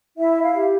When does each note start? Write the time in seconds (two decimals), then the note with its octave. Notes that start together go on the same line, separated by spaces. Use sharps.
0.18 E4 E5
0.43 F5
0.55 G4